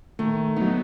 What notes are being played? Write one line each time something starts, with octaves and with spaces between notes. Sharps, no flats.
D#3 A3
F#3 B3 D#4